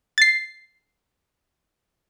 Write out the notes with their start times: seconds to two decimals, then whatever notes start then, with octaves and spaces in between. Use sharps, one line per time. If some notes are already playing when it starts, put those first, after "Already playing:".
0.18 A6 C7